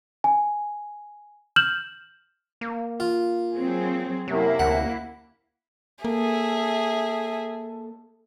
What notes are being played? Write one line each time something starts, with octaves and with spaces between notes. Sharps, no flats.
G#5
F6 G6 E7 F#7
A#3
F4
F#3 C4 G#4
F#2 C3 F#3 A#3 E4
D2 F#5
A#3 G#4 A4 E5